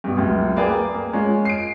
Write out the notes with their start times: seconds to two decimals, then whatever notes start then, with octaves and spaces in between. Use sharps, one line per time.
0.04 G2 B2
0.17 C#2 F#2
0.56 A#3 G#4 B4 D5 G5
0.94 A#3
1.13 G#3 C#4 F4
1.45 C7 D7